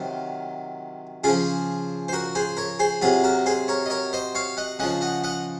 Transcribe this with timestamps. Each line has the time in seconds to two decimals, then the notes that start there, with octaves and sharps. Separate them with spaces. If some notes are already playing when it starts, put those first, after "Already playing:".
Already playing: C3 D#3 F#3 F4
1.24 C#3 F3 F4 G#4
2.08 C5
2.13 F#4 A#4
2.35 G#4 C5
2.57 A#4 C#5
2.79 G#4 C5
3.01 C3 F#3 F4 G#4
3.24 F#4 A#4
3.46 G#4 C5
3.68 A#4 C#5
3.86 D#5
3.90 A#4 C#5
4.13 C5 D#5
4.35 C#5 F5
4.57 D#5 F#5
4.79 C#3 F3 D#5 F#5
5.01 D#5 F#5
5.24 D#5 F#5